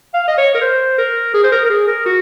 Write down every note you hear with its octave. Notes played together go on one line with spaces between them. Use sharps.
F5
D#5
C#5
A#4
C5
A#4
G#4
C5
A#4
A#4
G#4
A#4
F#4